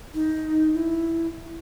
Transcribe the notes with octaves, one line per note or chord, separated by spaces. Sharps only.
D#4
E4